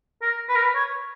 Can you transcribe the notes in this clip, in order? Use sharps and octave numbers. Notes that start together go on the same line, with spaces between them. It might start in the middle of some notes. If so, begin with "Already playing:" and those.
A#4
B4
A#4
B4
C#5